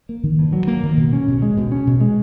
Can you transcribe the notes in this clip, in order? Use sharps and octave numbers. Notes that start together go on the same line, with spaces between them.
A#3
D#3
G2
F#3
A#3
D#3
B2
C#4
B2
G#3
B2
C#4
B2
G#3